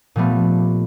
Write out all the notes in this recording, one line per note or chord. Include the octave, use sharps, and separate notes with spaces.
A#2 F3 G3 A3 B3